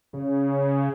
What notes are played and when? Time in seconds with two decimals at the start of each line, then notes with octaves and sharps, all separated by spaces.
0.13 C#3